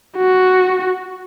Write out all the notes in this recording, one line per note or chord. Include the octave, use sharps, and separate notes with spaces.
F#4